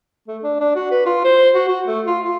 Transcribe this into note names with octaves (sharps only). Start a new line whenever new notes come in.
A3
D4
D4
F#4
B4
F4
C5
F#4
F#4
A3
F4
F4